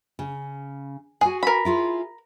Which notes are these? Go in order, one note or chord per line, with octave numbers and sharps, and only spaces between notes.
C#3
F#4 G#4 G#5
A#4 B5
E4 F4 G#4